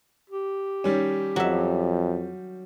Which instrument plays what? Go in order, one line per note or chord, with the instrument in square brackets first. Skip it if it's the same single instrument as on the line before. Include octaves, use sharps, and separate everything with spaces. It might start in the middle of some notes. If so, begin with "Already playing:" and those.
[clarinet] G4
[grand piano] D#3 G3 C#4
[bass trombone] F2 [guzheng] F#3 E5